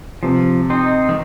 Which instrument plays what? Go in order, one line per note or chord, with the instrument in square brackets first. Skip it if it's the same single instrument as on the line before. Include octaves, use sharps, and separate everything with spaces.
[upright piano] C3 [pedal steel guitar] F3
[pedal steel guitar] C4 D#4 C5
[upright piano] D#3